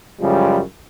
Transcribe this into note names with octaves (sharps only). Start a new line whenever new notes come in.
C#2 F#2 C#3 F3 G3 G#3